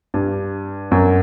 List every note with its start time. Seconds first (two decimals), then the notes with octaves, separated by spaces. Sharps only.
0.14 G2
0.91 F#2